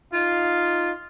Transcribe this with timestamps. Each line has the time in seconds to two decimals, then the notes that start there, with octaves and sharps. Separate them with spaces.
0.12 D#4 F4